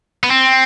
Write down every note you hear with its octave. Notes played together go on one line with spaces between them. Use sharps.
B3
C4